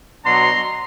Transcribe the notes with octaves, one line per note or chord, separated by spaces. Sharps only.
B2 F#3 B3 D4 A#5 C6